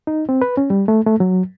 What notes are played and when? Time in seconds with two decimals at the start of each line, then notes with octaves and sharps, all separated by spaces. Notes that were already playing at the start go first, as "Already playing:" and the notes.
0.07 D#4
0.29 C4
0.42 B4
0.57 C#4
0.70 G3
0.88 A3
1.06 A3
1.20 F#3